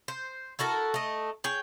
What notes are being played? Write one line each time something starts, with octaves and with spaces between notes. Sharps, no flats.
C5
E4 F#4 A4 A#4
A3 D#5
G#4 C#5 G5